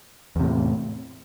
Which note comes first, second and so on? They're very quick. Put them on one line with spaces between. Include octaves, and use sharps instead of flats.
E2 C3 A2